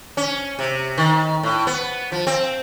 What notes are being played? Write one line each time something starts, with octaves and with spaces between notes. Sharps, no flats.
C#4
C3
D#3
A2
B3
F3
C4